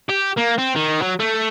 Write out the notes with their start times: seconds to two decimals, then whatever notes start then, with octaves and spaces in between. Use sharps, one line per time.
0.09 G4
0.37 A#3
0.58 C4
0.76 D#3
1.02 F#3
1.20 A3